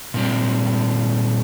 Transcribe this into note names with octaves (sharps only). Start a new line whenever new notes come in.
A#2 G3 C4